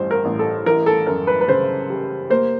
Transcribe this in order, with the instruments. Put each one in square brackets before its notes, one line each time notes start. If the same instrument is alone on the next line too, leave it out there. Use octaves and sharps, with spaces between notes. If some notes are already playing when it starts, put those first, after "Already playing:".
Already playing: [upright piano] A1 G2 C5
A#4
A1
A4
E3 A#4
A4
F#2 A#4
B4
B4
C#3 C5
G3
A#3 C5